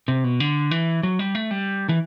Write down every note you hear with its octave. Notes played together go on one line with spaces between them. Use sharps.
C3
B2
D3
E3
F#3
G3
A3
G3
E3